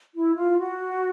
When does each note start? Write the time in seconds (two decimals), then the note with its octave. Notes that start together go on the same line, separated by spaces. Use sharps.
0.14 E4
0.36 F4
0.58 F#4